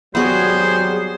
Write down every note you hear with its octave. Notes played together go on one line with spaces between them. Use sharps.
G#1 F#3 G3 B3 F#4 G#4 C5